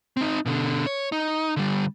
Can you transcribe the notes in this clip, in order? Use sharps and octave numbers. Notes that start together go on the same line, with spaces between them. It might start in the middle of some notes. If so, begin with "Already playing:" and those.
C4 D#4
B2 D3
C#5
D#4
D3 G3